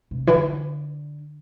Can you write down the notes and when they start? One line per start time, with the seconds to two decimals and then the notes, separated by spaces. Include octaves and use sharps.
0.11 C3
0.27 E3
0.34 D3